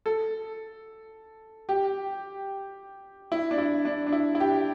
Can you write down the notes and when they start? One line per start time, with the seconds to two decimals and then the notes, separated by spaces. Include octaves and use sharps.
0.06 A4
1.69 G4
3.32 E4
3.51 D4
3.58 E4
3.85 D4
4.07 D4
4.12 E4
4.35 E4
4.40 G4